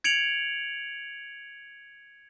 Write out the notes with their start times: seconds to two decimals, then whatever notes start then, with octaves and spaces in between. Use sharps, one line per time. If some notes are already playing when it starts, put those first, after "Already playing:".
0.04 G#6 C#7 D7 F7 F#7